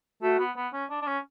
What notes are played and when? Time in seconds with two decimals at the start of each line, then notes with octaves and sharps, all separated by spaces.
0.22 A3 F#4
0.39 B3
0.57 B3
0.73 C#4
0.90 D4
1.02 D4
1.07 C#4